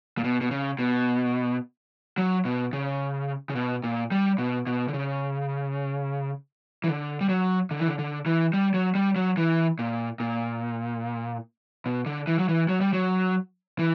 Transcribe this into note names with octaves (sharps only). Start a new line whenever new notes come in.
A#2
B2
B2
C#3
B2
F#3
B2
C#3
C#3
B2
A#2
G3
B2
B2
D3
C#3
E3
D3
G3
F#3
D3
E3
D3
D3
E3
G3
F#3
G3
F#3
E3
A#2
A#2
B2
D3
E3
F#3
E3
F#3
G3
F#3
E3